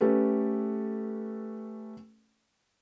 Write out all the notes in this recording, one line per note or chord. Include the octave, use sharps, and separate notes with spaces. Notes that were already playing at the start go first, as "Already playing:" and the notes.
A3 C#4 G4 A4 B4